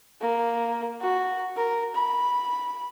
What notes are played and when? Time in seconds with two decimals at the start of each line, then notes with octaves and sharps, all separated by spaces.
0.21 A#3
1.01 F#4
1.56 A#4
1.95 B5